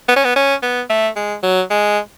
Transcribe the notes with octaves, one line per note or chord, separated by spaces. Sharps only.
B3
C#4
B3
C#4
B3
A3
G#3
F#3
G#3